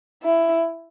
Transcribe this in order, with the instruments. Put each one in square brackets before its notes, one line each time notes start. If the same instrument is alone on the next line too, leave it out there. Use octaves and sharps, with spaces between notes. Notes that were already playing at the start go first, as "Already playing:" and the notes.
[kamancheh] E4